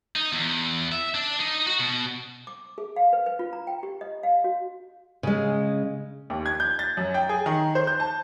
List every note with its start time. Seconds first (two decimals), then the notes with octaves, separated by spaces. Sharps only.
0.16 D#4
0.33 E2
0.92 E5
1.14 D4
1.40 D#4
1.67 F#4
1.79 B2
2.47 D6
2.78 G#4
2.96 F5
3.13 B4
3.26 B4
3.39 F4
3.53 A#5
3.67 G5
3.83 G4
4.01 D#5
4.23 F5
4.44 F#4
5.23 C#3 G#3
6.30 D#2
6.46 G#6
6.60 G6
6.79 A6
6.97 F#2
7.14 G5
7.29 G#4
7.46 D#3
7.75 C5
7.87 G6
8.00 A5